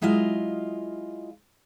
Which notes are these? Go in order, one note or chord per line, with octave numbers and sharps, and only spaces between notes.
F#3 G#3 E4 F4 D#5 F5